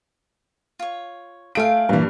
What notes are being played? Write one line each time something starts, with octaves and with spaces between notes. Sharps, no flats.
F4 C#5
A3 F4 G#4 F5 D7
G2 A#2 E3